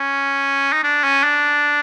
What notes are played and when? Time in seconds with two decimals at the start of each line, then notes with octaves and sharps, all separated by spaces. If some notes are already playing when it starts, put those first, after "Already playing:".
Already playing: C#4
0.73 D#4
0.84 D4
1.04 C#4
1.23 D4